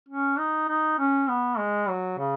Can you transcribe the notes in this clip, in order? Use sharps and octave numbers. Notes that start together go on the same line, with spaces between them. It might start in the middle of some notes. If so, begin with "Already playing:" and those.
C#4
D#4
D#4
C#4
B3
G#3
F#3
C#3